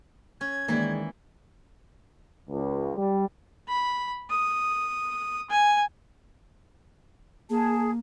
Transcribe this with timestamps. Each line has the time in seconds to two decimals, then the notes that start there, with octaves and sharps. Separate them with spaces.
0.41 C#4 G#6
0.68 D#3 E3 G#3 A#3 E4 D5
2.48 C#2
2.95 G3
3.68 B5
4.30 D#6
5.50 G#5
7.50 A#3 G#4 A5